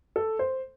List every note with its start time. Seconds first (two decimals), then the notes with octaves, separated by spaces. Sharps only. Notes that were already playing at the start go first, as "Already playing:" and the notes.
0.16 A4
0.39 C5